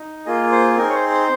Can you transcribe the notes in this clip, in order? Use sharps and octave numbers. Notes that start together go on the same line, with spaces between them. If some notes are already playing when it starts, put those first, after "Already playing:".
Already playing: D#4
A#3 F4 G#4 D#5
C5
C4 D#4 G#4 A#4
C#5
C5
C5